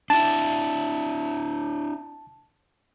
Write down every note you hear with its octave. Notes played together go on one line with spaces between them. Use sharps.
D4 E4 A5